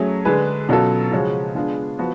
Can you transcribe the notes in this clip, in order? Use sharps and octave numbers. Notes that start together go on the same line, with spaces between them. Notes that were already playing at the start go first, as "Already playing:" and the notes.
Already playing: F#3 A3 C#4 G#4
D3 G#3 D4 G#4 B4
B2 F#3 C#4 F4 A4
C#3 F3 G#3 C#4 F#4
G#3 B3 D4 F4 G#4
F3 B3 F#4